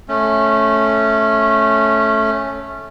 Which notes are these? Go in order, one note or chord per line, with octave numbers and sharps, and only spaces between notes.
A3 C#4